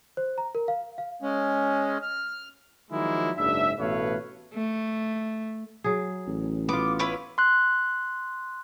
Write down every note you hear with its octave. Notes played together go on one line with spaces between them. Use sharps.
C5
A#5
A#4
F5
F5
G#3 C#4
F6
D#3 F3 F#3 G#3 A#3 E4
F#1 G#2 D4 E5
A1 B2 A3 B4 C#5 F5
A3
F#3 G#4
A1
B3 F4 D6
E4 B4 C#5
C6 F#6